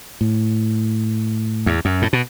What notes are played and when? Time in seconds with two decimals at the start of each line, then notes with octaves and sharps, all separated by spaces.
0.21 A2
1.66 E2
1.85 F#2
2.02 A2
2.13 B2